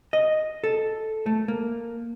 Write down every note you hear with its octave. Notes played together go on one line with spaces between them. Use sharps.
D#5
A4
A3
A#3